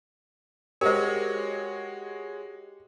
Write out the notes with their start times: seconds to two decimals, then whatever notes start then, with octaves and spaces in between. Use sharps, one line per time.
0.81 G#3 F#4 G4 A#4 C5 C#5 D#5